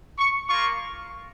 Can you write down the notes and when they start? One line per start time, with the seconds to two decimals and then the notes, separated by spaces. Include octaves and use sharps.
0.19 C#6
0.49 A#3 F4 C#6